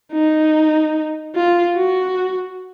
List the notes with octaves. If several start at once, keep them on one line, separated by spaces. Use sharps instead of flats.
D#4
F4
F#4